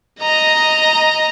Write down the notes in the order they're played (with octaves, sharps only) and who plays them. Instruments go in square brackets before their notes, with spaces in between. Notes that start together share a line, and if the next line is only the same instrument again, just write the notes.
[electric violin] D#5 A#5